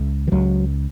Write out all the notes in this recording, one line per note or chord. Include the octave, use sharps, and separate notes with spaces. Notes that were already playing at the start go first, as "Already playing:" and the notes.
Already playing: C#2
E3
C#2 F#3